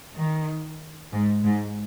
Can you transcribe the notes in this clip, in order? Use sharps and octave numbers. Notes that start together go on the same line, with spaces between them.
D#3
G#2
G#2